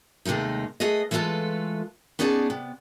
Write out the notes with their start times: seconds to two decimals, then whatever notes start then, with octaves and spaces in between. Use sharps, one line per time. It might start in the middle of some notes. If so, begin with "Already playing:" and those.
0.25 D#2 C3 G#3 A3 D#4
0.80 A3 G#4 B4 D#5
1.11 E3 G#3 A3 F4 A4 B4
2.19 B3 C#4 D#4 G#4 D5 A5
2.50 C3 B3